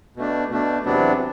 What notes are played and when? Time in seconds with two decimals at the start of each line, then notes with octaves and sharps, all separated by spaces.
0.16 B2 A3 D4
0.51 B2 A3 D4
0.85 E2 C3 F#3 B3 D4